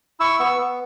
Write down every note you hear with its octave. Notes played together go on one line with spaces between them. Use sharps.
E4 C#6 E6
B3 C#6 E6
B3